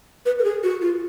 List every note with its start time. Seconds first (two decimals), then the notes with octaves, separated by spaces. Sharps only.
0.26 B4
0.39 A#4
0.44 G#4
0.63 F#4
0.81 F4